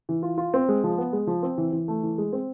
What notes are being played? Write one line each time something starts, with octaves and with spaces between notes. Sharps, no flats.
E3
F4
F4
C4
G#3
F3
B3
G#3
F3
C4
E3
E3
A3
E3
G#3
C4